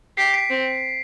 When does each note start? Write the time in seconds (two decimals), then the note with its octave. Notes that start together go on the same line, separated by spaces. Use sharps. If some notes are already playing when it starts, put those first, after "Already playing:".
0.17 G4 C7
0.33 B6 D7
0.50 C4